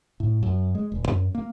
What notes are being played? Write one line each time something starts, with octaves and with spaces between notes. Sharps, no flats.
A2
F#2
G#3
D#1
F#2
A#3